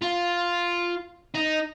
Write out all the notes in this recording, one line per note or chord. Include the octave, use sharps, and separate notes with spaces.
F4
D#4